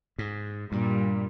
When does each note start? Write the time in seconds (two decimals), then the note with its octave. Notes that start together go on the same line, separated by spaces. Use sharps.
0.19 G#2
0.72 G2 A#2 G3